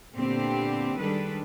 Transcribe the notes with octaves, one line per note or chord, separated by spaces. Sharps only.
A#2 D3 B3 C4 D4 G4
D#3 G3 G#3 D4 A4 B4